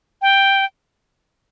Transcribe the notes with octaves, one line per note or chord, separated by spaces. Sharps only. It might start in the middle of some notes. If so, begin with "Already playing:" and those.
G5